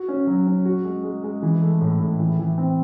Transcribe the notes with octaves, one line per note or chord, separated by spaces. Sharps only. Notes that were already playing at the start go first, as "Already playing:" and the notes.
Already playing: F#4
C#4
F#3
C#4
F#4
G#3
G#3
G#3
E3
A3
A2
A2
E3
E3
C4